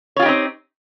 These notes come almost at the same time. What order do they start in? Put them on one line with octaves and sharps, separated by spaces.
C#5 F4 G4 D#4 C4